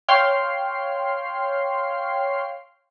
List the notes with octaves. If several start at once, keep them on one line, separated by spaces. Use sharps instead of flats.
C#5 F5 G5 C6 F6 C7